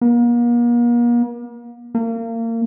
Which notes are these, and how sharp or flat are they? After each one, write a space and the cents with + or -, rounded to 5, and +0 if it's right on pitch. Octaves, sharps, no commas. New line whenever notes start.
A#3 +40
A#3 -30